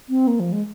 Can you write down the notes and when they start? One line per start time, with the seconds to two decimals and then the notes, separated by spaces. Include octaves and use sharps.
0.09 C4
0.27 A#3
0.40 F3
0.53 G#3